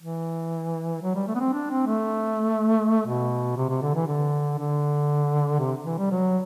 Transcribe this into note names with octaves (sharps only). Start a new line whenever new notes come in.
E3
F#3
G3
A3
B3
C4
D4
C4
A3
B2
C3
C3
D3
E3
D3
D3
C3
E3
G3
F#3